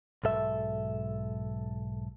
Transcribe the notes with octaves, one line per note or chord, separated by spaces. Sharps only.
B1 G#2 A4 E5